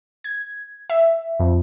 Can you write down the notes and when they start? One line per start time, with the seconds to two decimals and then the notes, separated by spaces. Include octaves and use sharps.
0.24 G#6
0.90 E5
1.40 F2